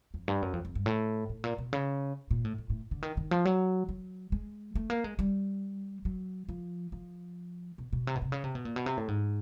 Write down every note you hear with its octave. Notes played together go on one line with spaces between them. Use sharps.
F2
G2
F#2
F2
F2
G2
A2
A2
A#2
B2
C#3
A#2
A2
A2
A2
D3
D#3
D#3
F3
F#3
F#3
G#3
A3
A#3
G#3
G3
F#3
F3
F3
B2
B2
C3
B2
C3
C#3
C3
B2
A#2
B2
C3
A2
G#2